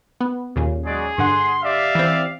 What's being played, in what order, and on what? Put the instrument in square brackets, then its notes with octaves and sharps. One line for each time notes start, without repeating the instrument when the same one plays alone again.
[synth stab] B3
D#2 A#2 C#3
[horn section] F#3 G#3 D5 [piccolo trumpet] G#4
[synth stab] G2 D3 F#5 [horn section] C6
[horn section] G4 D5 E5 [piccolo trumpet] F5
[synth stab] E3 C4